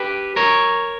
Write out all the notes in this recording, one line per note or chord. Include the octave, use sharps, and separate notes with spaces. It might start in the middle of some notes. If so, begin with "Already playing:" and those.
Already playing: G4 B4
A#4 C#5